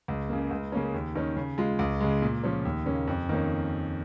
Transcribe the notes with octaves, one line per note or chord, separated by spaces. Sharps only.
C#2
C#3 A#3
C#2
C#3 A#3 C#4
D#2
D#3 C#4
C#3
G#3 F4
C#2
C#3 G#3
A#2
F3 C#4
D#2
C#3 A#3 C#4
F2
D#3 A#3 C#4